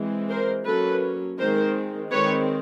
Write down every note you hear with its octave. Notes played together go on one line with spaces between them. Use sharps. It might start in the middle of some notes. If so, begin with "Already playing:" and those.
Already playing: E3 G#3 C4
A#4 C5
F#3 A#3 C#4 A4 B4
D#3 G#3 C4 A#4 C5
D#3 G#3 C4 B4 C#5